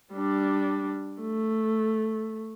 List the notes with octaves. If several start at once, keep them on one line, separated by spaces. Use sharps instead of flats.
G3 D4
A3